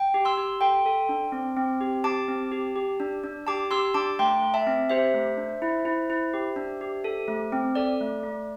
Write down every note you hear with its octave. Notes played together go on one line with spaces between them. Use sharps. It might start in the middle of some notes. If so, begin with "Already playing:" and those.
Already playing: G5
G4
C6 E6
G4
A4 G5 C6
A4
D4
C4
C4
G4
G4 A5 D6
C4
G4
G4
D4
D4
G4 A5 D6
G4 C6 E6
D4 A5 D6
A3 G5 C6
A3
E5 A5
C4
G4 C5 E5
A3
D4
E4
E4
E4
G4
D4
G4
A4
A3
C4
A4 D5
A3
A3